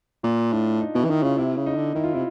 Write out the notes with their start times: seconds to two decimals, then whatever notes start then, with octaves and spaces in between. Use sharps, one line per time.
0.23 A#2 F4
0.52 A2 D4
0.81 D#4
0.94 B2 E4
1.05 E3
1.09 D#3 E4
1.23 C#3 F4
1.37 C3 E4
1.56 C#3
1.66 D#4
1.76 D3
1.95 D#3 E4
2.04 F4
2.13 C3 E4